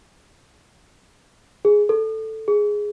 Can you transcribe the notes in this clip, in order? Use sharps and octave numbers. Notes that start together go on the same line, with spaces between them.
G#4
A4
G#4